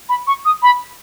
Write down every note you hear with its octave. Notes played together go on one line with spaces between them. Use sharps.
B5
C#6
D#6
B5